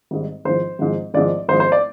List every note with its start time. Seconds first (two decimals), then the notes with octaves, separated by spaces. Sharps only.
0.11 G#1 G#2 G3
0.45 G#1 G#2 F3 C5
0.79 G#1 G#2 F3
1.14 G#1 G#2 F3 D5
1.48 G#1 G#2 F3 C5
1.60 C5
1.72 D5